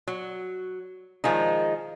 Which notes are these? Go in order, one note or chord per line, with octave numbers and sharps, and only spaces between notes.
F#3
D#3 F3 G#3 D#4